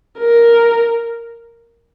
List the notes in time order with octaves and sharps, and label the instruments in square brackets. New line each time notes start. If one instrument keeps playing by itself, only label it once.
[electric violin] A#4